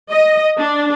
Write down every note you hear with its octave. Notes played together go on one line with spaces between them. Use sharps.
D#5
D4